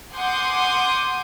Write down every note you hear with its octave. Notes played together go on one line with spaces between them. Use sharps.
F#5 G#5 C6 D6 D#6 G6